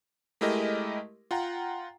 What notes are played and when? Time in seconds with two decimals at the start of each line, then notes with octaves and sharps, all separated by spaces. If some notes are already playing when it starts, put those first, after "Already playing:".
0.41 G#3 A3 E4 G4 A#4 D#5
1.31 F4 F#5 G5 A#5